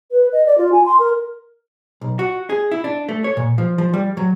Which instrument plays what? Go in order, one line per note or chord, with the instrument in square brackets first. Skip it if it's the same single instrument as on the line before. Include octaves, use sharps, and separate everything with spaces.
[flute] B4
D#5
D5
F4
G#5
C6
A#4
[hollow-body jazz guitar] B1
F#4
G#4
E4
D4
A3
C#5
A#2
F3
F3
G3
F#3